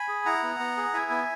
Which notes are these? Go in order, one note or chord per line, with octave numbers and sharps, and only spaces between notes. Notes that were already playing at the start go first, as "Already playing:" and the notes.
Already playing: G#5 B5
G#4
E4 F#5 A#5
B3
B3
G#4
E4 E5 G#5
B3